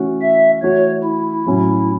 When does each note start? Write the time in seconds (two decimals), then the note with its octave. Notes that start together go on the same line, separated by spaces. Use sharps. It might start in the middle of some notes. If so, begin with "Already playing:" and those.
Already playing: E3 A3 C#4 F#4
0.22 E5
0.63 E3 A3 F#4 C#5
1.04 E4
1.46 A2 F#3 C#4